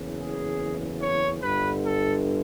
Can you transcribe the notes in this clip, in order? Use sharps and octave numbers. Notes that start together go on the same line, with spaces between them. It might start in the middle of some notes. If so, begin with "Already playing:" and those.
Already playing: F#1 E2 C#3
G#4
C#5
G1 G2 D3 B4
A4